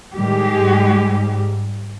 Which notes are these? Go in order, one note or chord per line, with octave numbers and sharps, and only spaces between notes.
A2 D#3 G3 G#3 G4
G#2 G3